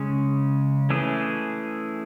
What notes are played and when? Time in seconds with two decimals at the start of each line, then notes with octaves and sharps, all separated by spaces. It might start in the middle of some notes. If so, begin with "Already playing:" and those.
Already playing: C#3 G#3 C#4
0.90 E3 A3 C#4 G#4